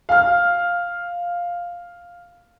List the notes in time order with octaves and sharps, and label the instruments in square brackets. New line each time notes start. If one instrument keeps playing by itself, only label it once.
[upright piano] F5 F6